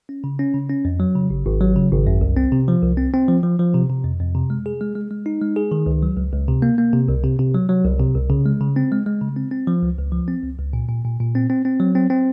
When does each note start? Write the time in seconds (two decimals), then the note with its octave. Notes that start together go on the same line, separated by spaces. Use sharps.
0.09 C#4
0.24 C#3
0.39 C#4
0.54 C#3
0.70 C#4
0.85 F2
1.00 F#3
1.15 C#3
1.30 G#1
1.46 G#1
1.61 F#3
1.76 C#3
1.91 G#1
2.07 F#2
2.21 C2
2.37 C4
2.52 C3
2.68 F3
2.83 C2
2.97 C4
3.14 C4
3.28 F3
3.43 F3
3.59 F3
3.74 C3
3.89 C3
4.04 F2
4.20 F2
4.35 C3
4.50 G#3
4.66 G#4
4.81 G#3
4.96 G#3
5.11 G#3
5.26 D#4
5.42 G#3
5.56 G#4
5.72 D#3
5.86 C#2
6.03 F#3
6.17 C#2
6.32 C#2
6.48 C3
6.62 A#3
6.78 A#3
6.93 C3
7.08 C2
7.24 C3
7.39 C3
7.54 F#3
7.69 F#3
7.85 C2
8.00 C3
8.15 C2
8.30 C#3
8.46 G#3
8.60 C#3
8.76 C4
8.92 G#3
9.06 G#3
9.22 C#3
9.36 C4
9.51 C4
9.67 F3
9.83 C#2
9.98 C#2
10.12 F3
10.28 C4
10.43 C#2
10.58 C#2
10.73 A#2
10.88 A#2
11.05 A#2
11.20 A#2
11.35 C4
11.50 C4
11.65 C4
11.80 F#3
11.95 C4
12.10 C4